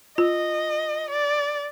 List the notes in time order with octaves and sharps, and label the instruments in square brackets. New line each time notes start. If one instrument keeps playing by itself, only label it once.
[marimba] F4 [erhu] D#5
[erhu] D5